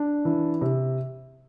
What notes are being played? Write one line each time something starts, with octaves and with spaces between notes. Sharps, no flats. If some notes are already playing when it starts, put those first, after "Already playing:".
Already playing: D4
E3
C3